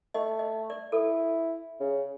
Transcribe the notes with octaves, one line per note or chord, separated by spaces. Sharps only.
A3 D#5
D#5
D5
E4 A4
C#3